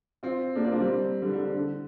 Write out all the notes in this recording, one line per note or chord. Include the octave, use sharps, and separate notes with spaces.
C4 F4
A#3 D4
C4 F4
A#3 D4
G3 C4
D3 G3
D3
D3
D3